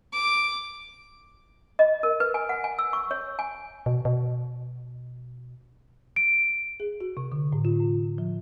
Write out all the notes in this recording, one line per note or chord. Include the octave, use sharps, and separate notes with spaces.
D6
D#5
A#4
B4
G#5
F#5
G#5
E6
C#6
C#5
G#5
B2
B2
D7
G#4
F#4
C3
D3
A2
F4
A2
F3